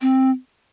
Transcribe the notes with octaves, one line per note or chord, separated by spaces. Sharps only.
C4